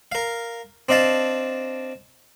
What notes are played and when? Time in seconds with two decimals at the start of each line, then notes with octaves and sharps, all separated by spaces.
0.12 A#4 F5
0.89 C4 D4 D#5 F5 A5